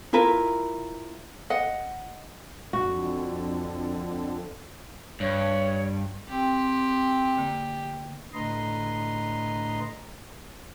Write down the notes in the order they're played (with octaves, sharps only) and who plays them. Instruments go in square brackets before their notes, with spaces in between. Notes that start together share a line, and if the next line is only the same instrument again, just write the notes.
[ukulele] E4 F4 A#4 B4
D#5 F#5
[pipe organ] F2 D3 [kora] F#4
[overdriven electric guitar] G2 [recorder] C#5
[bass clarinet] C4 [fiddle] G4
[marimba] D3 A#3
[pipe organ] A2 D3 B4 D#5 A#5 C6